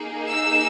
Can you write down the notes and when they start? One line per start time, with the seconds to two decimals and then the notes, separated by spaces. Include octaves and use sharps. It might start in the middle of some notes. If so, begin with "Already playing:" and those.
Already playing: A#3 D#4 G#4
0.29 E6